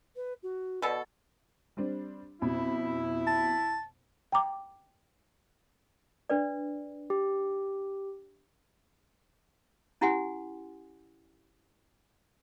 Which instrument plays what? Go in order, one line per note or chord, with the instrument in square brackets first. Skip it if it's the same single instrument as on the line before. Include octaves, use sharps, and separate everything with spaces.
[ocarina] B4
F#4
[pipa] B2 A4 [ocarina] D5
[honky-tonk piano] G3 C4 D4
[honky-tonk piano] F2 B2 B5 [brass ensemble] E4
[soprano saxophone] A5
[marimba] G5 A#5 D6
[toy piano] D4 B4 D5
[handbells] G4
[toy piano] C#4 E4 G4 F#5 G#5 C6